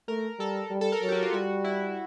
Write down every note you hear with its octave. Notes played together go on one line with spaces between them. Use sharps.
A3 A#4
G3 A4
G3
A4
A#4
F#3 A4
G4
F#4
F4
G3 F#4
E4